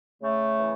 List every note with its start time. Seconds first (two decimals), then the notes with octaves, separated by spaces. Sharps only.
0.22 C#3 A3
0.60 E3